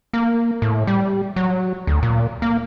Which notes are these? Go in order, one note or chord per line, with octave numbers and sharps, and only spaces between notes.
A#3
A2
G3
F#3
D2
A#2
A#3